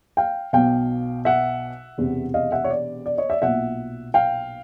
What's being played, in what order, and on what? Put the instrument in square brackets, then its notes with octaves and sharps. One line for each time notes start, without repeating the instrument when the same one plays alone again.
[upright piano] F5 G5
B1 B2 F5 G5
E5 F#5
E1 E2 C3
D#5 F5
E5 F#5
C#5
D5
D5
C#5 D#5
D5 E5
B1 A#2 E5 F#5
F5 G5